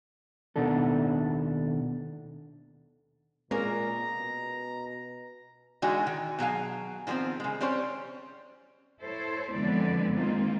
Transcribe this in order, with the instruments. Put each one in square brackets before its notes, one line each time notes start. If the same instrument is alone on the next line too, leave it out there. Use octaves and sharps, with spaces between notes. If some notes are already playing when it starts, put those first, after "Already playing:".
[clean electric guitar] D#2 B2 D#3 D4 A4
[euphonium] A#2 [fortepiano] G#3 A#3 [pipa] C#4 A#4 [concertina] A#5
[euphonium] B2
[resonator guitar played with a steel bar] D3 E3 G#3 D#4 F#4
D#3
B2 F#3 G#4 F5
D#3 F3 G3 B3 C4
C#3 G#3
G3 C4 C#4 C5 C#5
[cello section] E4 A4 C5 C#5
F2 D3 E3 G#3 B3 D5
D#3 G#3 A#3 C4 D#4 F4